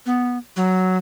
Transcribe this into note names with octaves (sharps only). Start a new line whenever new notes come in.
B3
F#3